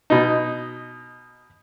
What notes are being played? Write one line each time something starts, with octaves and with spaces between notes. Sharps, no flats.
B2 D#4